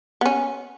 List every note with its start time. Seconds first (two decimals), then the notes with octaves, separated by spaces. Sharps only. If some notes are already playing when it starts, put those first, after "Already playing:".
0.21 B3
0.26 C#4